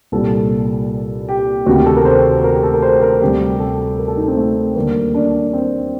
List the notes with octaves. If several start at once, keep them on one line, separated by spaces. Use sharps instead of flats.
C2 A#2 G3 A4
G4
D2 C3 D#3 F#4
G4
A4
A#4
C5
A#4
G4
A4
A#4
C5
A#4
D2 C3 G3 G4
A4
A#4
A4
D#4
C4
A3
D#2 D3 G3 A#3
D4
C4